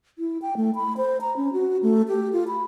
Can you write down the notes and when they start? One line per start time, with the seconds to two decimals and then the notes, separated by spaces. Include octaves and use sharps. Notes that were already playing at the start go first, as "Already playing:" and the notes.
0.19 E4
0.42 G5
0.57 A3
0.75 B5
0.97 C5
1.21 A#5
1.37 C#4
1.53 F#4
1.83 A3
2.08 G4
2.33 F4
2.48 B5